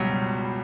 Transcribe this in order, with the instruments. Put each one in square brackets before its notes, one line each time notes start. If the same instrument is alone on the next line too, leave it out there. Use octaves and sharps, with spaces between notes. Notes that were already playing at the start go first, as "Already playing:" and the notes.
Already playing: [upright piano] C#2 B2 F#3 G3